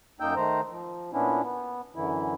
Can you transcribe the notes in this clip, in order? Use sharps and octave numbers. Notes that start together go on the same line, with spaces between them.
F#2 A#3 D#4 G5 E6 G6
D#3 A3 C5 A#5
F3
A#2 B3 C#4 D4 E4
B3
F#2 D3 E3 E4